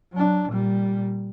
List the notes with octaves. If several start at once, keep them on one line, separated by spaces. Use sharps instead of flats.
F#3 D4
A#2 G3